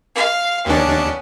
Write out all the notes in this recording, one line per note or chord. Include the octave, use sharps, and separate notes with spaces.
F5
D#2 B3 C#4 D4